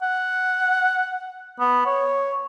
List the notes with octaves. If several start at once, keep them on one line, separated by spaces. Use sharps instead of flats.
F#5
B3
C#5